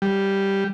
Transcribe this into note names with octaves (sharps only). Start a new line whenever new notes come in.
G3